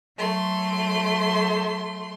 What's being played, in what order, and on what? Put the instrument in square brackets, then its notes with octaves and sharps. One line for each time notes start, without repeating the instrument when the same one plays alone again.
[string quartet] F#3 A3 C6